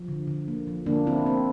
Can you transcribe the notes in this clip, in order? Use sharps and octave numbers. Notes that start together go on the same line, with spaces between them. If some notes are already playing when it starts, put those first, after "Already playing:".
Already playing: F3
D3
D3
A#3
F3
D3 A#3 D4
D3 C4 E4
A#3 C4